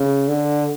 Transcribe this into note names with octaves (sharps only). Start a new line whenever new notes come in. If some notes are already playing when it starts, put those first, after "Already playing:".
Already playing: C#3
D3